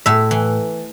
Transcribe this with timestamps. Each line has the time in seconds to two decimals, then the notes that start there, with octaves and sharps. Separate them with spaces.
0.06 A2 E5
0.31 E3